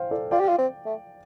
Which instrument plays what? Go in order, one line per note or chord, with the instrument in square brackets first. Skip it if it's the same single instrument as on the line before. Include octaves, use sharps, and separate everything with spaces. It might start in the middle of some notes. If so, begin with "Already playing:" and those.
Already playing: [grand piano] C5 F5 G5
A4 D5
[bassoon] F4 [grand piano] D5 G5
[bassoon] G4
F4
C4
A3